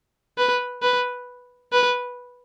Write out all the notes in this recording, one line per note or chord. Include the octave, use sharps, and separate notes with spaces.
B4
B4
B4